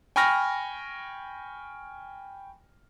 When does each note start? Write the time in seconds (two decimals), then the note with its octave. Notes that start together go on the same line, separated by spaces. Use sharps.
0.16 G5 G#5 B5 C#6 F6 A#6